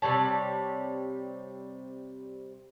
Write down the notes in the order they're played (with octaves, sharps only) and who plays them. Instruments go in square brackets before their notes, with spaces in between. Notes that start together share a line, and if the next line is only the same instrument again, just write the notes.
[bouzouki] C3 G3 C#5 A5